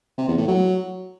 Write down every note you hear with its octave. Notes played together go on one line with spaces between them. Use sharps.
C3
E2
A2
F#3